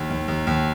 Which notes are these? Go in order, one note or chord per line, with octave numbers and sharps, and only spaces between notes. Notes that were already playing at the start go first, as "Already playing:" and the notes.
Already playing: D#2
D#2
D#2
D#2